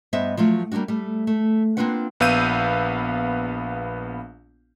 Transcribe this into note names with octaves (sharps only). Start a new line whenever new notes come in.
G2 B3 C5 D#5 E5
F3 F#3 A3 F4
G3 A#3 C4 D4 F#4
G3 A3
A3
A#3 C4 D4 F4 B4 F#5
A#1 B3 F5 E6 G6 D#7